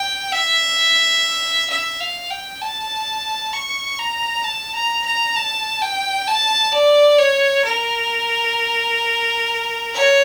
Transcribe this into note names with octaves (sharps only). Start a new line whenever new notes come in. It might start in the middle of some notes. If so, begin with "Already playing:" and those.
Already playing: G5
E5
E5
F5
G5
A5
C#6
A#5
A5
A#5
A#5
A5
G5
A5
D5
C#5
A#4
C#5